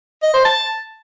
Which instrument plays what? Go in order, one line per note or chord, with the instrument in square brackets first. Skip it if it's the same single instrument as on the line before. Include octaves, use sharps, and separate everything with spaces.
[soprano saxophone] D#5
C5
A5